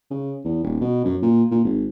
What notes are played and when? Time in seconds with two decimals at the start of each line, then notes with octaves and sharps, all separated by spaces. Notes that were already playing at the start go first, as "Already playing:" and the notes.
0.11 C#3
0.44 E2
0.64 D#1
0.81 B2
1.04 F#2
1.22 A#2
1.51 A#2
1.64 G#1